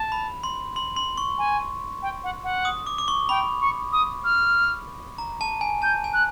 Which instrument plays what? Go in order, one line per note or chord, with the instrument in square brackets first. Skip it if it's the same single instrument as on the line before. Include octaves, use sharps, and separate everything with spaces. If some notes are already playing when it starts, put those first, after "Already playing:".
Already playing: [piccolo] A5
[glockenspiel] B5
C6
C6
C6
C#6
[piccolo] G#5
G5
F#5
F#5
[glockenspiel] D#6
D6
D6
C#6
[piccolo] G5 [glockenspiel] B5
[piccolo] C#6
D#6
F6
[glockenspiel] A#5
A5
G#5
[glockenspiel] A5 [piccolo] G6
[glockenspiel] G#5
[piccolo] F#6